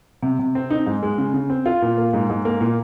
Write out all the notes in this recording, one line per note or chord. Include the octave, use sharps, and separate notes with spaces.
C3
C3
C4
D#4
G#2
G#3
C#3
C#3
C4
F4
A#2
A#3
G#2
G#2
A#3
A#2